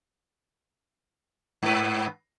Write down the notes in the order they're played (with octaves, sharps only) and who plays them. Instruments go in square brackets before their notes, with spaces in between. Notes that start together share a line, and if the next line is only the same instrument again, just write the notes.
[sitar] G#2 B4